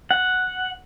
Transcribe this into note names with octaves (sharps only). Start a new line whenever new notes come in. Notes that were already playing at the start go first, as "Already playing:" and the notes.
F#5